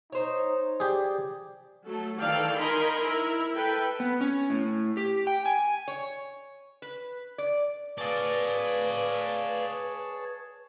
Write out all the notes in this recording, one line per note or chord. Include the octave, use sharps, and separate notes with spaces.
D#4 C5 C#5
G4 G#4 D5
F#3 A3 A4
D#3 E3 A4 D5 F5 G5
D#4 A#4 D#5 G#5 B5 C6
E4 A#4
A4 B4 E5 G5
B3
C#4
A2
G4
G5
G#5
C#5
B4
D5
G#4 B4 C#5 D5 F5 A5